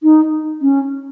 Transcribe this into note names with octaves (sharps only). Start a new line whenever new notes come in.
D#4
C#4